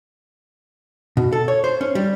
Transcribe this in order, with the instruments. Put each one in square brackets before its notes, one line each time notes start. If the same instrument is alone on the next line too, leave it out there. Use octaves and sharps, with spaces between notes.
[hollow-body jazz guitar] B2
A4
C#5
C5
C#4
G3